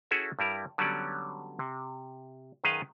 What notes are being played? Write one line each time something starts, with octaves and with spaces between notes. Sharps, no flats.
C#4 E4 F#4 G#4 A4 E5
G2 G3 E4 A#4
D3 F#3 G3 B3 C#4 D5
C3
F#2 D#3 G#4 B4 D#5 F5